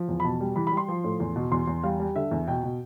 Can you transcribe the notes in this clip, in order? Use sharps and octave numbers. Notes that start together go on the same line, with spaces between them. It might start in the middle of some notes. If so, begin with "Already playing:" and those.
Already playing: F3
E2
B5
B2 A5
G3
E3 B5
G3 B5
C6
F3
A2
E2
B2
E2 C6
E2
G3 F5
G3
D3 E5
E2
B2 G5
B2